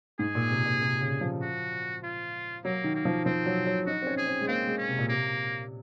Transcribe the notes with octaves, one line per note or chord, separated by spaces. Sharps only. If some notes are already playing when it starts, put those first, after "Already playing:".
G#2 G#4
A#2
C3
A#2
C3
C#3
F3
F#4
F4
F#3 A#3
D#3
A#3
F3
F3 C4
F#3
F#3
D#4 F#4
C4
C#4
G#4
C4
G#3
A#3 C4
G#3
C#4
C3
A#2
C3 A#3